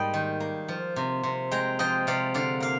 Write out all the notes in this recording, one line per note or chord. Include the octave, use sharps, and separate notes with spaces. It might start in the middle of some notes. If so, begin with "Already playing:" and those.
Already playing: G#2 G3 A#3 D#5 G5
D#3
A#3
F3
C3
C3
G#3 G5 A#5
F3 D#5 G5
C3 D5 F5
D3 D5 F5
A#3 F5